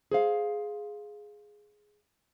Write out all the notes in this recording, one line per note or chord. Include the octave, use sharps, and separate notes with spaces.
G#4 C5 F5